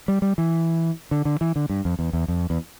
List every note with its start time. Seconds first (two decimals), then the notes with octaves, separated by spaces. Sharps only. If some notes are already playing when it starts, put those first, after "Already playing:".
0.08 G3
0.22 G3
0.38 E3
1.11 D3
1.25 D3
1.41 E3
1.56 D3
1.70 G2
1.85 F2
1.99 E2
2.13 E2
2.28 F2
2.50 E2